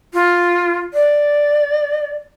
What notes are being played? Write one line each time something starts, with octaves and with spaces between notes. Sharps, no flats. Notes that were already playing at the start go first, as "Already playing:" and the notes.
F4
D5